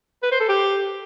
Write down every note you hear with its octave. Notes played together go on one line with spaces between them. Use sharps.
B4
C5
A4
G4